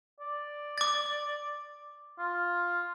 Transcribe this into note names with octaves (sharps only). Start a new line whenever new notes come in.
D5
D6 A6
F4